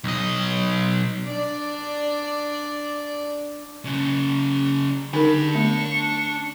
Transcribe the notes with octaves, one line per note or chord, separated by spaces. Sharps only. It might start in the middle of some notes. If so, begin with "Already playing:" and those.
B1 D#5
D4 D5
C#3 F#3
D3 D4 D#4 A#4 B5
A3 B3 C#6